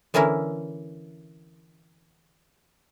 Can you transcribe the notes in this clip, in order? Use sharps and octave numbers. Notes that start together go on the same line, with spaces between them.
D3 E3 A#3 C#4 E4 A#4